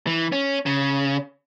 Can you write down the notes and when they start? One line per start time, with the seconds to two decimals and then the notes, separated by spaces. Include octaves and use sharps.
0.07 E3
0.32 C#4
0.66 C#3